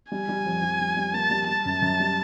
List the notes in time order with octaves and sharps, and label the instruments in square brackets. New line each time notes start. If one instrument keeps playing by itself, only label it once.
[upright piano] G3 [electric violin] G#5
[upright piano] G3
F2
G3
G3
G3
[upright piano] A#3 [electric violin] A5
[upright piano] G3
[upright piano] G3 [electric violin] A5
[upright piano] F#2
F#2
G3